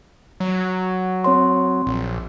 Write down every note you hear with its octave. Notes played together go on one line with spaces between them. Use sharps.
F#3
C4 C#5 C6
A#1